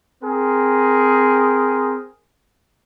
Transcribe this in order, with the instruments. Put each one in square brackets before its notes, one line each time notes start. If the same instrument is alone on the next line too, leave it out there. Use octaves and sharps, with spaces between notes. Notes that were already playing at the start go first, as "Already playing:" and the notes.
[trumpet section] C4 G#4 A#4